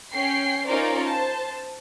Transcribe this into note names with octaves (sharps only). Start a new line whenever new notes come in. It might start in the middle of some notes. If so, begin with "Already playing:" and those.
C#4 G5 C7
C#4 D#4 F4 A#4 C5 D5
C5 A5